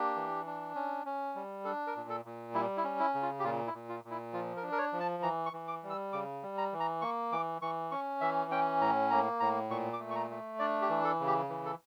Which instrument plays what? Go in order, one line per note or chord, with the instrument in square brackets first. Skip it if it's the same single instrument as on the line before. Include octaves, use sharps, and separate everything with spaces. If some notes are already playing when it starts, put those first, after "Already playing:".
Already playing: [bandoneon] A#3 D4 G4
E3
D4
C#4
C#4
G3
D4 A4
A#4
A#2
A4
A#2
G3 E4
E4
C#4
E4
C#3
F4
G4
A#2 F4
E4
A#2
F4
A#2
E4
F3 F4
A#4
D4
A#4
C#5
F3
A5
E3 A#5
C#6
E3
D6
G3
E6
C#3 D6
G3
A#5
E3
A#5
A#3 C#6
E3 D6
E3 C#6
C#4 C#6
E3 E5
C#4 G5
A2 A#5
A#3 A#5
A2 A#5
A#2 C#6
D6
A3
C#6
A#5
A3
D4 D5
G4
E3
A4
C#3
G4
E3
A4